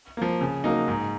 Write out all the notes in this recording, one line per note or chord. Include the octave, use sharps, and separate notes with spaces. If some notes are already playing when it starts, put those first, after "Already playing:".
F3 A#3
C#3
F#3 A#3 D#4
G#2